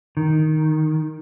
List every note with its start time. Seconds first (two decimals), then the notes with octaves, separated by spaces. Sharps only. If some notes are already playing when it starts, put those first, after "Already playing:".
0.17 D#3